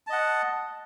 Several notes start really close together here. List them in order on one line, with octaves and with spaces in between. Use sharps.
A5 D#5 F#5